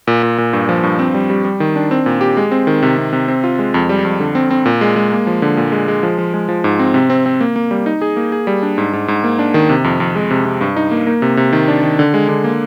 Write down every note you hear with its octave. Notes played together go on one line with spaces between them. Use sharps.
A#2
A#2
A#2
G2
F3
G2
C4
G3
G3
G3
D#3
D4
C4
A#2
G4
G#3
C4
D#3
C3
C3
C3
C4
F4
G#3
F2
G3
F2
D3
C4
C4
A#2
G#3
G#3
A#3
F3
D3
A#2
G#3
G#3
F3
F3
G#3
F3
G#2
C4
C3
C4
C4
A#3
A#3
G3
D#4
G#4
A#3
G#4
G3
D4
G#2
G#2
G#2
A#3
D4
D#3
C3
F2
F2
G#3
C3
C3
G2
D#4
A#3
A#3
C3
C3
D#3
D4
D#3
D3
G#3
D3
A#3